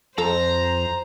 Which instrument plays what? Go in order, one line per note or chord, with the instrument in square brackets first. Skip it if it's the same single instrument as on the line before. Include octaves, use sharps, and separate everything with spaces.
[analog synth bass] F2 [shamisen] A4 [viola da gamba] C5 [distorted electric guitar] A#5